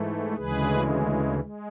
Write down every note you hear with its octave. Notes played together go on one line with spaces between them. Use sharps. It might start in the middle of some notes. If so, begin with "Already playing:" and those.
Already playing: G#2 E3 A3
D2 C#3 E3 G#3 G#4 B4
G#3